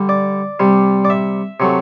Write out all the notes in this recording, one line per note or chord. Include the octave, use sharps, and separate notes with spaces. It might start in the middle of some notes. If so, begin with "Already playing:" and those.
Already playing: D3 G3
D5
C3 G3
D5
E5
C3 F#3 A3